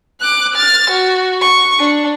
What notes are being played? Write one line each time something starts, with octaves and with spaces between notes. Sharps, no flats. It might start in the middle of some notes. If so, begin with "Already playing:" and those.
D6 F#6
F6 A6
F#4
C#6
D4